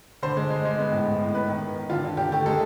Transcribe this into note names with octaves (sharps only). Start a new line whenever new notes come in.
D3 C5
G#3
G#3
G#3
B3
A2
A2
A2
B3 B4
D#3
D#3
D#3
D3 F4
D3
D3 G4
A3 G4
G#3 A4